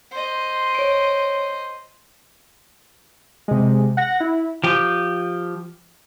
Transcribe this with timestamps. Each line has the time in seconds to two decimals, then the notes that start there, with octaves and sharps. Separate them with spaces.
0.11 C5 D#5
0.75 C#5 D7
3.48 C3 G#3
3.97 F#5 A#6
4.20 E4
4.64 F3 G4